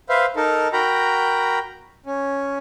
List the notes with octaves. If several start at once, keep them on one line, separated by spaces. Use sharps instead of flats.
B4 C5 E5 F5
D#4 A4 A#4
F#4 A#4 G5 A#5 B5
C#4